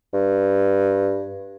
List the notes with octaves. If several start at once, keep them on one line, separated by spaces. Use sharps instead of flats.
G2